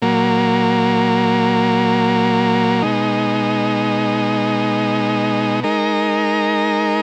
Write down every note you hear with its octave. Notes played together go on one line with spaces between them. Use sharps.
A#2 F#3 A#3
B2 G#3 D#4
G#3 D#4 A#4